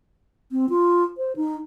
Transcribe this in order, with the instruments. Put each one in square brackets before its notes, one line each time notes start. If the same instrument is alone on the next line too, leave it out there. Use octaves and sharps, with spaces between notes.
[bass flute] C4
F4
C5
D#4